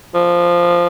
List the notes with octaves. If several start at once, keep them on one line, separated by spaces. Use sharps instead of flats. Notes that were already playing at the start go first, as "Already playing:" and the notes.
F3